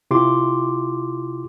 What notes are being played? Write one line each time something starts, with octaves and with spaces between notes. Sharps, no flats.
C3 E4 F4 G4 C6 D6